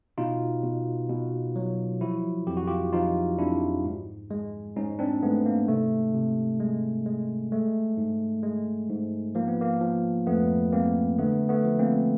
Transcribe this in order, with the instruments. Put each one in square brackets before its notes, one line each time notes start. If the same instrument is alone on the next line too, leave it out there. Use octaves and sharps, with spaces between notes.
[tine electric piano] B2 D#4 F4
B2
B2
F#3
F3 E4 F#4
F2 G4
F#4
F4 G4
F3 D#4 F4
F2 D4 E4
G#2
G#3
G#2 C#4 D#4
C4 D4
G#2 A3 B3
A#3
C3 A3
C3
G#3
G#3
G#3 A3
G#2
G#3
G#2
F3 A#3
B3
A#3
F3
F2 A3 B3
G#3 A#3 C4
D3 A3 B3
A3 B3
F3
A#3 C4